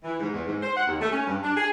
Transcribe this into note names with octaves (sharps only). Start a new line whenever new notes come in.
E3
G#2
E2
G#2
C5
F#5
D#2
A3
C#4
G2
D4
G#4